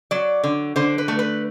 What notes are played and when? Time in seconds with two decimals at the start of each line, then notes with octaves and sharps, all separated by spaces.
0.11 F#3 D5
0.44 D3
0.76 D3 C5
0.98 B4
1.08 A3
1.19 B4